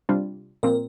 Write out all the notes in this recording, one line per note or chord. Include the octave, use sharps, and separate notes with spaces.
C3 G3 D4 F4
A#2 F3 C4 A#4